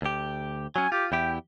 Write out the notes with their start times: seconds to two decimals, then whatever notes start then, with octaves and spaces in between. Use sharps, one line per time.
0.02 D2 G4
0.76 F#3 C#4 G#5
0.92 F4 G4
1.12 E2 E4 G4 G5